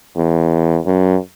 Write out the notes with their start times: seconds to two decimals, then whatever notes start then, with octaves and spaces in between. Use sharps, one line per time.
0.16 E2
0.86 F#2